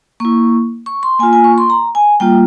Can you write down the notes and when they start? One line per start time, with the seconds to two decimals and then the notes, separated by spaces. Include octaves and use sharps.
0.20 A#3 E4 C#6
0.86 C#6
1.03 C6
1.19 A#3 F4 G#5
1.33 G#5
1.44 C#6
1.58 C6
1.70 A#5
1.95 G#5
2.20 G3 A#3 F4 G5